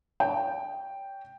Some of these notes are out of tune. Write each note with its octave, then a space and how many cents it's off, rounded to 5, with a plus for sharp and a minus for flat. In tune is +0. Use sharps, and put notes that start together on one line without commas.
C#5 +35 G5 +0